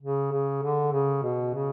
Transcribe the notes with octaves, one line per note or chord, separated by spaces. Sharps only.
C#3
C#3
D3
C#3
B2
C#3